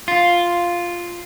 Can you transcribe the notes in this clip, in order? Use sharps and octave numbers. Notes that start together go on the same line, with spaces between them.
F4